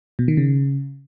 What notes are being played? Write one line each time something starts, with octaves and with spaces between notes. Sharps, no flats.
B2
D#3
C#3